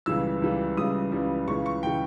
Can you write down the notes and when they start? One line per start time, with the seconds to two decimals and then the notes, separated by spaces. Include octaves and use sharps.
0.06 C#2 C#3 E3 G3 E6
0.42 C#2 C#3 E3 G3
0.77 C#2 C#3 E3 G3 D#6
1.12 C#2 C#3 E3 G3
1.47 C#2 C#3 E3 C#6
1.66 C#6
1.83 C#3 E3 G5